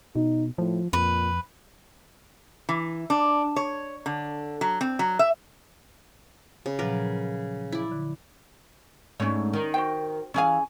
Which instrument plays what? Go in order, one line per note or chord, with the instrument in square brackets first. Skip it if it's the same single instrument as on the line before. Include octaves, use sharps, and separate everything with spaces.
[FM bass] B2 [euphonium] D#4
[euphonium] A2 [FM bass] F3
[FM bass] F2 [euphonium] A#2 [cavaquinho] B4
[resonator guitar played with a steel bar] E3
D4
C#5
D3
F#3
C4
F#3
E5
[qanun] C#3
[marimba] A#2 F3 F#3 [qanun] A#4 B4
[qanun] E4 D5
[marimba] D3
[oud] G#2 A3 D4 [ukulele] C#4 C#5
[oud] D#3
[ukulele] F#4 C5 G5
[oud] E3 C#5 F5 [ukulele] C#4 G#4 G#5